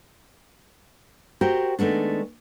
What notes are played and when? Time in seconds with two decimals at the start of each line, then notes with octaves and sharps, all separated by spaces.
1.41 F#4 G4 A#4 C5 G5
1.79 D#3 G#3 A3 B3 D4